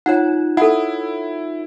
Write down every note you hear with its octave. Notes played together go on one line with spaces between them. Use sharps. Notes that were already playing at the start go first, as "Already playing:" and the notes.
D#4 F4 C#5 F#5
E4 A4 F#5